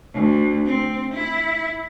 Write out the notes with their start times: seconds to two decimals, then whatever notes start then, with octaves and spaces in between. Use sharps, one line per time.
0.14 D2
0.66 C4
1.14 E4